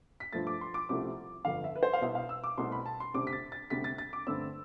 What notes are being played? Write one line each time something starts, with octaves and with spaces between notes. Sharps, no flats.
B6
G2 F3 A3 A6
D6
C6
D6
C2 C3 F3 A3 C4 D6
G1 F2 D3 F5
E5
B4
C5
F5
C2 B2 B3 E5
F5
E6
D6
C2 B2 A3 C4 C6
B5
A5
C6
D2 C3 G3 C4 D6
B6
A6
A6
D2 C3 G3 B6
A6
A6
D6
G2 D3 A3 C4 E6